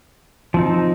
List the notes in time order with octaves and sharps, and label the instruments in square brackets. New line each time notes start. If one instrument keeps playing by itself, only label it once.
[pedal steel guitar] F3 C4 D#4